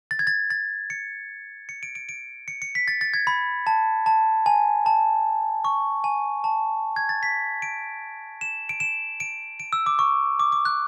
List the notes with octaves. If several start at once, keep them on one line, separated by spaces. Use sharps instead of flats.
A6
G#6
A6
A6
C#7
C#7
D7
D7
D7
C#7
C#7
B6
A6
A6
G#6
B5
A5
A5
G#5
A5
C#6
G#5
A5
G#6
A6
B6
D7
E7
D7
E7
D7
D7
E6
D6
C#6
D6
D6
F#6